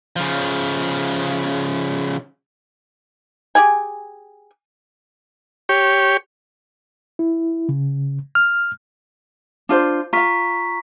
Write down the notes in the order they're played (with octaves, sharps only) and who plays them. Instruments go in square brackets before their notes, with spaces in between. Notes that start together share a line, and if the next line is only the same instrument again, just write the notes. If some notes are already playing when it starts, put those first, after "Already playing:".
[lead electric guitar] C#3 F3
[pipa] G4 G#4 G#5
[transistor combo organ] G4 C#5
[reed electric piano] E4
C#3
F6
[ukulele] D4 F4 C5
[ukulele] F4 F5 [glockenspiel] A#5 C#6 B6